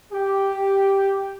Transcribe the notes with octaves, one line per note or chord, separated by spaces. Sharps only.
G4